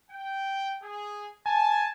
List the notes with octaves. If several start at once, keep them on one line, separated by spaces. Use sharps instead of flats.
G5
G#4
G#5 A5